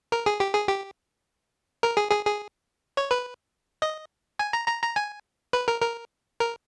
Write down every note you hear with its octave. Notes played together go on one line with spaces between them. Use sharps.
A#4
G#4
G4
G#4
G4
A#4
G#4
G#4
G#4
C#5
B4
D#5
G#5
A#5
A#5
A#5
G#5
B4
A#4
A#4
A#4